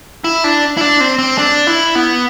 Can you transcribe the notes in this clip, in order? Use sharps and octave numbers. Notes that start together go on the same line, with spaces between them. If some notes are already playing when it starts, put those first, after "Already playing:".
E4
D4
E4
D4
C4
C4
D4
E4
B3